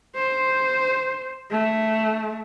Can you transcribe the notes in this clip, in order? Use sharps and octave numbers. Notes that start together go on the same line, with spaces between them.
C5
A3